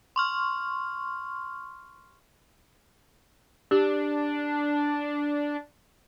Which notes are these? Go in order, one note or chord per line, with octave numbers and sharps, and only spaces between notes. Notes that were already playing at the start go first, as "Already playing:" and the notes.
C6 C#6 F6
D4 G4